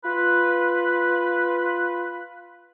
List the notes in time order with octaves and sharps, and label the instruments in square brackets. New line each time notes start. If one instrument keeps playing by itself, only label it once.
[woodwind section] F4 B4